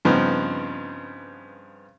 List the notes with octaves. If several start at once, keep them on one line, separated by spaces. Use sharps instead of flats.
G2 C#3 F3 B3 C4 D#4